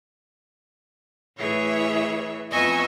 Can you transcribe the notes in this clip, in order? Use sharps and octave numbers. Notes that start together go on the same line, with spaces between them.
A2 E3 G#4 C#5 E5
F2 B3 D#5 E5 G#5 C#6